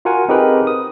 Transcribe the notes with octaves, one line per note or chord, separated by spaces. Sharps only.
F4 F#4 A#4 F#5 G#5
C4 D#4 G4 G#4 A#4 B4
D#6